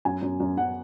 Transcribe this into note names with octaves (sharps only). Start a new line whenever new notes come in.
F#2 G#5
F#2
F#2
F#2 F#5